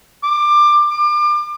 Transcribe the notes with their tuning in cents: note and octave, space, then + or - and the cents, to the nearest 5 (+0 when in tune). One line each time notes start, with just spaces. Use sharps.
D6 +20
D6 +30